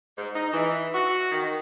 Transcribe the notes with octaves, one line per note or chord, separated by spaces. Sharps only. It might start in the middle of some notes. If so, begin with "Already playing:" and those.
G#2
D#4
E3
F#4
D#3